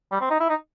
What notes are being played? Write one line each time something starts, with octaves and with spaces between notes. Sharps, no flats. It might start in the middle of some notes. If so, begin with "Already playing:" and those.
G3
C4
D#4
E4
D#4